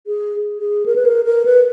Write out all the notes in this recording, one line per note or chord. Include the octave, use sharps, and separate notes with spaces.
G#4
G#4
A#4
B4
A#4
A#4
B4